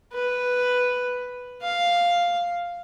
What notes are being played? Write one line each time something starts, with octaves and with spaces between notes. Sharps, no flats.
B4
F5